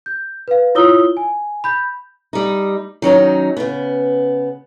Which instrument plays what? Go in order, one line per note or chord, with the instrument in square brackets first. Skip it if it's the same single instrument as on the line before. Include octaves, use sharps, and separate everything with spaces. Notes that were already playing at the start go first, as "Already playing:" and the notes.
[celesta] G6
B4 F5
E4 F4 C#5 D#6 E6 G7
G#5
B5 G6
[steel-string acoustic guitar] G3 D#4
D#3 F#3 C#4 D#4
C#3 B3